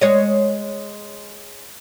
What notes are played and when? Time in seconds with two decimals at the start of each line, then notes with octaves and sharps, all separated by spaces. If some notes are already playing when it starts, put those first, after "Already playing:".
0.01 G#3 C#5 D#5